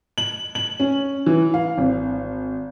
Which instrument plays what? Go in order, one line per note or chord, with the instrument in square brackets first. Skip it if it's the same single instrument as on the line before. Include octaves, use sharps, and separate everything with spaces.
[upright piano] F#7
F#7
C#4
E3
F5
G#1